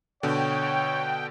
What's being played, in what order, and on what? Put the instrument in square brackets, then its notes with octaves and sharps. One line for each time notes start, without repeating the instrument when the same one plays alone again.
[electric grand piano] B2 D3 [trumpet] C#5 [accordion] G5